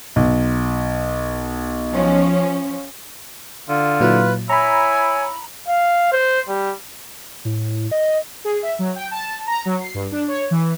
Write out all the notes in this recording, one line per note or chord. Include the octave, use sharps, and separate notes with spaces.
B1
F3 C#4
D3 F4
A#2 F#3 E4 B4
E4 C#5 G#5 A#5 B5
F5
C5
G3
A2
D#5
G#4
E5
F#3
G5
A5
A#5
F#3
C7
G2
D4
C#5
E3